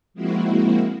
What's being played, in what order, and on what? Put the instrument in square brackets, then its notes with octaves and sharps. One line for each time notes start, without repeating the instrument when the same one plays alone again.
[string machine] F3 G#3 A#3 C4 E4 F#4